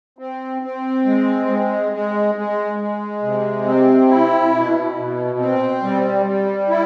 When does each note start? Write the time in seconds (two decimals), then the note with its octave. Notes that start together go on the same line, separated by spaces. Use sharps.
0.18 C4
0.62 C4
1.05 G#3
1.48 G#3
1.92 G#3
2.35 G#3
2.79 G#3
3.22 C3
3.66 C4
4.09 E4
4.53 B2
4.96 B2
5.39 C4
5.82 G3
6.26 G3
6.69 E4